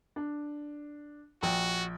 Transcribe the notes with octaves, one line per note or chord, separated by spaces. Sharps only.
D4
A#1 F#4 G5